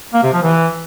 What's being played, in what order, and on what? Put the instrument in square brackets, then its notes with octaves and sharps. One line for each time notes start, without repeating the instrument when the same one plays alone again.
[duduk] A#3
C3
F3
E3